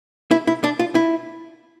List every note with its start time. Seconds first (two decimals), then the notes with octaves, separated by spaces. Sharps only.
0.31 E4
0.47 E4
0.64 D4
0.79 F4
0.95 E4